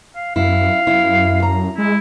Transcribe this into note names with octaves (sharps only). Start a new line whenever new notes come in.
F5
F#2 E4 F5
F#2 E4
F#2 A#5
G#3 E4